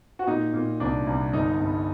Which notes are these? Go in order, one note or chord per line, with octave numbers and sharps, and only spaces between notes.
F#4
A#2 D#4
A#2
C2 D4
C2
G1 D#4
G2